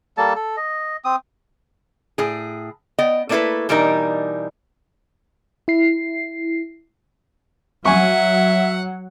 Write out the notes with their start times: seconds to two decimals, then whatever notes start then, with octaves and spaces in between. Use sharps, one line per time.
0.17 G3 A#3 A4 A5
0.36 A4
0.57 D#5
1.05 C4 D#6
2.18 A2 G#4
2.98 B3 D#5 G5
3.29 A3 A#3 D4 E4 A4 B4
3.69 B2 E3 G3 D4 D#4 A#4
5.68 E4 C7
7.85 F#3 E5 F#5 G#5 C#6